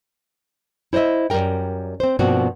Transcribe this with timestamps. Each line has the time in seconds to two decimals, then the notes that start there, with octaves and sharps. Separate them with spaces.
0.93 E4 C5 C#5 D#5 E5
1.30 F#2 B2 G3 A#4 G5
2.00 C4 C5
2.19 G2 B2 F3 A#3 C4 F#4